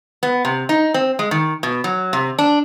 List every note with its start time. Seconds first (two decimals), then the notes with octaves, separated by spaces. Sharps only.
0.23 B3
0.45 C3
0.69 D#4
0.94 C4
1.19 G#3
1.31 D#3
1.63 B2
1.84 F#3
2.13 C3
2.39 D4